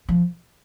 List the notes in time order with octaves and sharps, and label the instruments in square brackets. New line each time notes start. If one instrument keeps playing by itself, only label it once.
[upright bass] F3